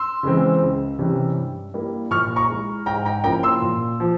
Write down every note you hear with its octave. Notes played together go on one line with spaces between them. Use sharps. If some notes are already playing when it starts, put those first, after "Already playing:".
Already playing: C6 E6
C#3 E3 G#3 C4
C#2
C3 E3 G3 C#4
G2
G3 A#3 E4
A#2 C#6 F6
A#5 C#6
G#3 E4
G#2 G5 A#5
G5 A#5
F3 A#3 C#4 E4 G5 A#5
C6 E6
A#2
F3